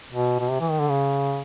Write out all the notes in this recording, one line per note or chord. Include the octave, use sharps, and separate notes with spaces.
B2
B2
C3
E3
D#3
D3
C#3